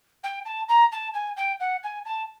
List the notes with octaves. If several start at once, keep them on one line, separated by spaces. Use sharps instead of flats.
G5
A5
A#5
A5
G#5
G5
F#5
G#5
A5